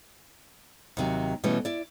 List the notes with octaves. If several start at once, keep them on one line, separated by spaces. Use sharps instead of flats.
D#2 C3 F#3
B2 E3 G3 A3 C#4
E4 D5